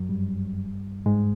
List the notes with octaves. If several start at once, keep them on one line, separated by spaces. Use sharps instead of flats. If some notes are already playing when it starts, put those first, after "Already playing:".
Already playing: F#2 F#3
G2 G3
G#2 G#3